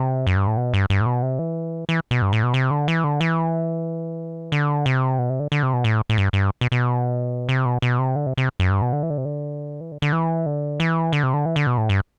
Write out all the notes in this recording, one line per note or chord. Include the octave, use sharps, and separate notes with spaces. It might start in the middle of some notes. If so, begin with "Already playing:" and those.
Already playing: C3
F#2
G2
A2
B2
G2
G2
A2
B2
C3
E3
E3
B2
G2
A2
B2
C3
D3
E3
D3
E3
D3
C3
B2
C3
D3
D3
C3
B2
A2
A2
G2
G2
B2
B2
C3
B2
B2
C3
D3
C3
C3
F#2
G2
B2
D3
E3
D3
C3
D3
E3
D3
D3
E3
D3
E3
D3
C3
D3
E3
D3
B2
A2
G2